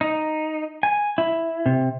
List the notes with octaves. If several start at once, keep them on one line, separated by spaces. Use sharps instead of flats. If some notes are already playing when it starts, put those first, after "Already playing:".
D#4
G#5
E4
C3